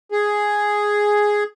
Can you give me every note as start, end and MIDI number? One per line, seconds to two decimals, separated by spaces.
0.12 1.44 68